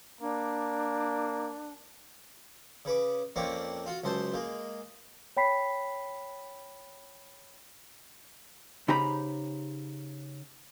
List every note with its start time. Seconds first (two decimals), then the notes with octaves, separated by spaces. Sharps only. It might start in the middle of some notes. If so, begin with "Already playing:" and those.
0.21 A#3 D4
2.85 C#3 B4 D6
3.36 F2 A#3 C4 C#4 D5 C#6
3.86 F4 F#4
4.04 C#2 F#2 C5 A5 C6
4.34 G#3 A#3
5.37 C#5 G5 B5 B6 C7
8.88 C#3 D#4 G4 C5 A#5 B5